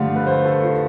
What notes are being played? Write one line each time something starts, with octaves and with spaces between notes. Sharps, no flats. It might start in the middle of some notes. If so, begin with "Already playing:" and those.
Already playing: G2 D3 F3 A3 F4
B4
C5
A4
F4